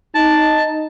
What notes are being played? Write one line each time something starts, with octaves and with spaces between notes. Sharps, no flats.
D#4 A5